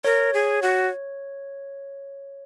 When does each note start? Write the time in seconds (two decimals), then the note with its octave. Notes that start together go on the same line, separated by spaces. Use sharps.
0.05 A#4 C#5
0.34 G#4
0.62 F#4